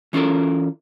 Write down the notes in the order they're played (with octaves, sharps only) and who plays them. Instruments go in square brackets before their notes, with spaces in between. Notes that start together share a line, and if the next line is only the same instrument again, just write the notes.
[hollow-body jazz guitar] E3 C#4 F4 A4 A#4